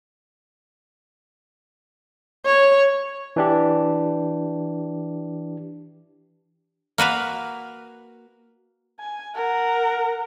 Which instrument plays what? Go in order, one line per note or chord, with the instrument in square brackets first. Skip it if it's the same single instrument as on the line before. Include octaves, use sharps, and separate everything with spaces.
[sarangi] C#5
[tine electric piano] E3 D4 G4
[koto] A#3 F#4 B4 F5
[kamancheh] G#5
A#4 F#5